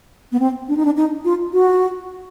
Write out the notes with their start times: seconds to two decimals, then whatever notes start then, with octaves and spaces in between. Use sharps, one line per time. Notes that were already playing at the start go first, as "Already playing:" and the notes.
0.32 B3
0.39 C4
0.68 D4
0.77 D#4
0.85 D4
0.97 D#4
1.25 F4
1.53 F#4